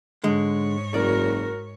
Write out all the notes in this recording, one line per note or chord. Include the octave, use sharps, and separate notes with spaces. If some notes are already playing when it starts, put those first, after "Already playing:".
G#2 D3 G#3 C#5
F#1 F#4 A#4 D5